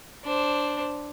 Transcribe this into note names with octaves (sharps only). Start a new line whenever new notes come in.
D4 C5